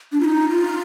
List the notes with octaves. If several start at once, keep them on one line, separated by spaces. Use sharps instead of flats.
D4
F4
D#4
F4